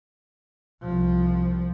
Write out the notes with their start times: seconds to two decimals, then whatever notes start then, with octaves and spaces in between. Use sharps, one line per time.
0.82 C2 F3